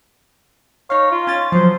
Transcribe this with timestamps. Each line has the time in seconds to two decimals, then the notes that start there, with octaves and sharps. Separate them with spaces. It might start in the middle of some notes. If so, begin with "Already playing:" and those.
0.90 D#4 C#5 F5
1.11 F4
1.27 C#4 A6
1.52 F3 F#3 C5